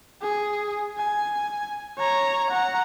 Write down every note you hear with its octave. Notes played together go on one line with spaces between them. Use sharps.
G#4
G#5
C#5 A#5
F#5 A#5